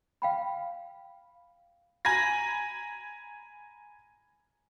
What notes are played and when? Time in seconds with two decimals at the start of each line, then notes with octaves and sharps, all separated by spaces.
0.22 F5 G5 B5
2.05 G#5 A#5 B5 G#6 A#6